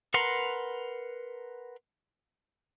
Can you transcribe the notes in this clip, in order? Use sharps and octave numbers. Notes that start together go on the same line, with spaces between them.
A#4 B4 F#5 A#5 C6